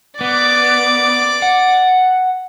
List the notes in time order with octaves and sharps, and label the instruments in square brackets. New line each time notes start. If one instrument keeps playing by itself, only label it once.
[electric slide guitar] B3 [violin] D5 D6
[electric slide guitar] F#5